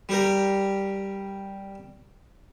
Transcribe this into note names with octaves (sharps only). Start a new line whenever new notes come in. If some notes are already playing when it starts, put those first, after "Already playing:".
G3 G4 A#4